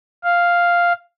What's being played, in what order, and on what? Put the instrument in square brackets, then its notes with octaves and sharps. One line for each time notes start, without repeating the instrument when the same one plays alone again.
[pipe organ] F5